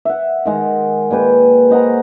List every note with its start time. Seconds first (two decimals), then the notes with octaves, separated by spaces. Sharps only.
0.05 E5 F#5
0.46 D#3 G#3 F#5
1.11 A#2 G#4 B4 G5
1.70 C5 D#5 F#5 A#5